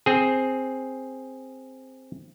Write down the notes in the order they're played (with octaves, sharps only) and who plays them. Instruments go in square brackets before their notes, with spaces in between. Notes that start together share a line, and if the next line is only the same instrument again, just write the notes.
[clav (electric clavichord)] C4 G#4